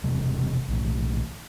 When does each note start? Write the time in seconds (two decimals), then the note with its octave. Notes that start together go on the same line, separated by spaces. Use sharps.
0.04 E1 E2 C3 G3
0.68 B1 A2 E3